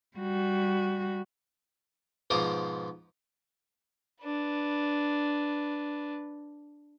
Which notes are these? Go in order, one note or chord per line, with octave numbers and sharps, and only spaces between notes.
G3 F#4
G#2 B2 F3 C5 D6 D#6
D4 B4